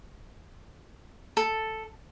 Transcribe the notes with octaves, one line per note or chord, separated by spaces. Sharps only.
A4